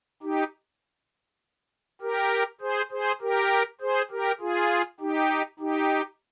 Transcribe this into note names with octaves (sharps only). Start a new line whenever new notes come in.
D#4 G4
G4 A#4
G#4 C5
G#4 C5
G4 A#4
G#4 C5
G4 A#4
F4 G#4
D#4 G4
D#4 G4